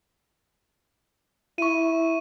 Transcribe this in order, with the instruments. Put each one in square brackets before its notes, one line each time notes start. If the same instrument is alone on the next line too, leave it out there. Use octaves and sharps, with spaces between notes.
[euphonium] E4 [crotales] C#6 D#7